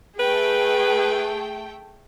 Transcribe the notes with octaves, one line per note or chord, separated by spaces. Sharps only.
A3 G#4 B4 G5